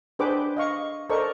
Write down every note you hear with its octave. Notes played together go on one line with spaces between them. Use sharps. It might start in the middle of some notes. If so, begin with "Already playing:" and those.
D4 G#4 B4 C5 G5 D6
D#5 F5 C#6
A4 A#4 C5 D5 D#5 C#6